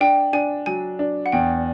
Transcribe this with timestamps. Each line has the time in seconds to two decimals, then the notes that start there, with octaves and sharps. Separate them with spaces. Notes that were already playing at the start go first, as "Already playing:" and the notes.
0.01 D4 G5
0.33 D4 G#5
0.66 F#3 G#5
0.99 D4
1.26 F#5
1.32 E2 G5